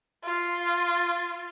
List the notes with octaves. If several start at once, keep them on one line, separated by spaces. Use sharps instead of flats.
F4